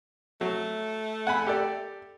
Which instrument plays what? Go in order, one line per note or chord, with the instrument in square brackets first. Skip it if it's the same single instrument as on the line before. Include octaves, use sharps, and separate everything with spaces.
[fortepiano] F#3 [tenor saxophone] A3
[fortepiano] F#5 G#5 B5
G4 A4 D5